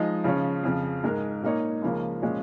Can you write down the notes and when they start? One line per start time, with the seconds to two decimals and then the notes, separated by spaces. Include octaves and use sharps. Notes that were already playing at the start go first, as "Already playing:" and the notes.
Already playing: F3 G#3 D#4 D#5
0.24 C#3 F3 C#4
0.63 F2 C#3 F3
1.04 G#2 G#3 D#4 A#4
1.43 A#2 A#3 D#4 C#5
1.82 C#2 C#3 F3 A#3 C#4
2.22 A#2 F3 G#3 C#4 F4